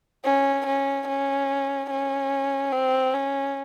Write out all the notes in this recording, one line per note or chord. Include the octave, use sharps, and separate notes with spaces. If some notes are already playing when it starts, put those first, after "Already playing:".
C#4
C#4
C#4
C#4
C4
C#4